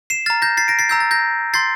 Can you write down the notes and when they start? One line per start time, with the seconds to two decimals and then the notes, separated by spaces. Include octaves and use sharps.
0.10 C7 E7
0.26 A#5 F6 A6
0.42 G6 A#6
0.57 A6 C7
0.68 A#6 D7
0.79 A6 C7
0.89 A#5 E6 G6
1.00 A6
1.11 G6 A#6
1.54 C6 G6 A6 C7